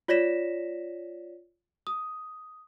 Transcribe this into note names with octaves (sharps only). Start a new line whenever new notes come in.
F4 C#5 D5 A#6 B6 E7
D#6